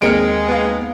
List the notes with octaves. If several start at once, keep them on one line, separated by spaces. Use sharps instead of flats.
D#2 G#3 C4 A#4 F6 C#7 D7
B3 F5